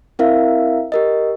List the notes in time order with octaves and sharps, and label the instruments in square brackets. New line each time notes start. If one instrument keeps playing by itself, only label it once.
[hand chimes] C4 E4 A#4 E5 F5
G4 A#4 D#5